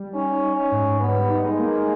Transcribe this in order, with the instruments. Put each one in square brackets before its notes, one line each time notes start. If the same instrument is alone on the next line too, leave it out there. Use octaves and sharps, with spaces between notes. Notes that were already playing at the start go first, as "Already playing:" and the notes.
Already playing: [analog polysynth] G3
[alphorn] C#4 [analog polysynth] D#4
[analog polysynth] D#4
[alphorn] C#4
[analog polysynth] G#2
[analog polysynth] G3 [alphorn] B3
[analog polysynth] D#4
[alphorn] G#3
[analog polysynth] A#3